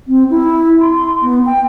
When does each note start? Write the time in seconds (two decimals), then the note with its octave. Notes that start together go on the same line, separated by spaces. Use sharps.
0.07 C4
0.30 E4
0.81 C6
1.23 B3
1.46 G5